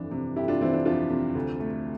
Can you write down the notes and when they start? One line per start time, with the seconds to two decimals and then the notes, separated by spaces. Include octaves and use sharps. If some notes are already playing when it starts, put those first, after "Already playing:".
Already playing: G1 F2 E3 D4
0.11 C3
0.36 G1 E4 G4
0.48 D4 F4
0.61 E3 C4 E4
0.74 D4
0.85 F2 D4 F4
1.10 C3
1.35 D2
1.60 A3